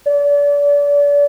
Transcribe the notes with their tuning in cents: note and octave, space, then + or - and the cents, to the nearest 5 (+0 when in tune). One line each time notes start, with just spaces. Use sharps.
D5 -35